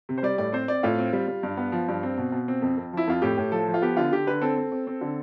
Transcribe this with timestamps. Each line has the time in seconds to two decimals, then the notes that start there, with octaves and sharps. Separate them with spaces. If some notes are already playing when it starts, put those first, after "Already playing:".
0.09 C3
0.18 C5
0.23 G3 D5
0.38 A2 D5
0.53 C4 C5
0.68 C4 D5
0.83 A2 F4
0.98 C4
1.13 G3
1.28 G3
1.43 G2
1.57 B3
1.72 F3
1.88 G2
2.03 C4
2.17 B2
2.32 B2
2.48 C4
2.62 F2
2.77 F2
2.93 F3 E4
3.07 F2 F4
3.22 A2 G4
3.38 A2
3.52 F3 A4
3.68 F3
3.74 F4
3.82 B3 G4
3.97 D3 F4
4.12 D3 G4
4.27 D3 B4
4.41 C4 A4
4.57 C4
4.72 C4
4.87 C4
5.01 D3